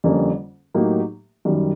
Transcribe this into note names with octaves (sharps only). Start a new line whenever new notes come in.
F2 D3 G3 A#3 C#4
A2 F#3 A#3 D#4 G4
F#2 D#3 G3